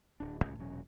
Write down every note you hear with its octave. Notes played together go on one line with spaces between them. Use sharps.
D1 D4
C2 A2 C#4
E1 A#2 F#3 C#4